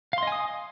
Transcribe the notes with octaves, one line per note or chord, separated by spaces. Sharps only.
D#5 F5 G#5 C6 D#6